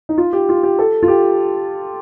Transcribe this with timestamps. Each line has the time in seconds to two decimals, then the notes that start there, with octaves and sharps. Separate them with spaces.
0.09 D#4
0.18 F4
0.33 G4
0.49 F4
0.63 G4
0.79 A4
1.03 F4
1.08 G4